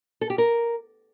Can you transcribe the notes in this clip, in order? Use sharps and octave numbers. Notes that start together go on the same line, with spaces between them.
A4
G4
A#4